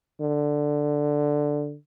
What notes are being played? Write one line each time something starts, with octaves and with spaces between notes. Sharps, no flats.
D3